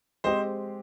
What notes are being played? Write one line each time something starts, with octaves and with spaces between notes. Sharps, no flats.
G#3 C4 G4 C5 D#5